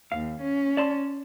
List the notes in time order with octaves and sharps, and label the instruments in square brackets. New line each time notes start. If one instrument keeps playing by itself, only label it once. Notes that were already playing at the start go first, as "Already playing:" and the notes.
[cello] D#2 [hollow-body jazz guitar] F5
[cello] C#4
[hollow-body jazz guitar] D5 A5 C6